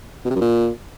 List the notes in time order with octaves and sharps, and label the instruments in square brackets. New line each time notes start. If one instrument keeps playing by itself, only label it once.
[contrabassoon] B2
C3
F#2
A#2